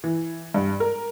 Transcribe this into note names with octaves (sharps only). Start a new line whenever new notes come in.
E3
G2
A#4